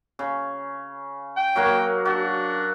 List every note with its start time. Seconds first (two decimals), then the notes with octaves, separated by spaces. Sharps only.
0.19 C#3
1.37 G5
1.56 F#3 A#3 F#4
2.05 D4 F#4